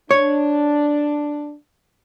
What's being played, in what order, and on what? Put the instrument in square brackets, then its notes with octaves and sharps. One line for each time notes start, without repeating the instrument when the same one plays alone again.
[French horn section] D4 [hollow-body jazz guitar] C#5